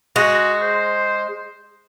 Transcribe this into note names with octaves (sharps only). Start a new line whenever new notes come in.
G#3 F#4
C5